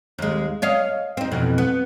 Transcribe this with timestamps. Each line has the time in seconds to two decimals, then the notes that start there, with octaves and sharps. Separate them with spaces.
0.19 D#2 G#3
0.62 C#5 D#5 F5
1.17 C4 D#4
1.31 F2 B2 E3
1.58 B3